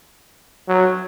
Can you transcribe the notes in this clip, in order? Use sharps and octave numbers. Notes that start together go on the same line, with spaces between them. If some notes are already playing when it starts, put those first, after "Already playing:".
F#3